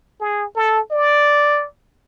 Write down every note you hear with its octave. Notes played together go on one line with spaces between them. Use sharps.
G#4
A4
D5